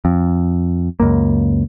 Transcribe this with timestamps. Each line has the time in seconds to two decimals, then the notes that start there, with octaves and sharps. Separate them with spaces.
0.05 F2
1.00 C#2 F#2 A#3